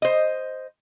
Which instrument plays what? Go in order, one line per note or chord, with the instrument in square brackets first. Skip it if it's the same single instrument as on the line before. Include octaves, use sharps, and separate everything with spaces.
[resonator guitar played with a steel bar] C5 D#5